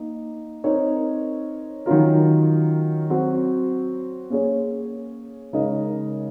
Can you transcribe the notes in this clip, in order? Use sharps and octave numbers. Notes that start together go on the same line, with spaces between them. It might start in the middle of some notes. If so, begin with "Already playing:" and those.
Already playing: A#3 D#4
C4 D#4 A#4 C#5
D#3 F#3 C#4 F4 A#4
F#3 C4 F#4
A#3 C#4 G#4 C#5
C#3 G#3 D#4 A#4 D#5